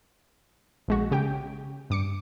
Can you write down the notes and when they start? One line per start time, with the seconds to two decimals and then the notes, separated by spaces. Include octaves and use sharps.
0.88 A#1 G#3 F#4
1.11 C#3 G4 G5
1.90 G2 D6 C#7